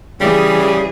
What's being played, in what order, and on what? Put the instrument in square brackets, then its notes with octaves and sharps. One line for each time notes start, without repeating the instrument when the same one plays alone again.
[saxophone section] C#3 G3 [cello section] E3 G#4